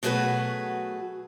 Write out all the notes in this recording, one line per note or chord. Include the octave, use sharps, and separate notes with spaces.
B2 F#3 A3 F#4 G#4 B4